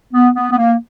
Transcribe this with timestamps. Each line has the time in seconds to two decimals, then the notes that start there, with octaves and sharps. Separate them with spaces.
0.14 B3
0.35 B3
0.51 B3
0.58 A#3